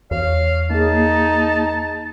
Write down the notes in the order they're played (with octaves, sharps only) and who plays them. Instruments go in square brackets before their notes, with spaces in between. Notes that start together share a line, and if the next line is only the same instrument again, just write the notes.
[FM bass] E2 [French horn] C#5 [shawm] F5
[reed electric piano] A#3 G#4 [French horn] D#4 [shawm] A5